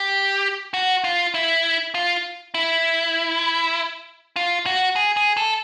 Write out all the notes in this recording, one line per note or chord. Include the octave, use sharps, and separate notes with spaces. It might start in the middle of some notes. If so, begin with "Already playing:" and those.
Already playing: G4
F#4
F4
E4
F4
E4
F4
F#4
G#4
G#4
A4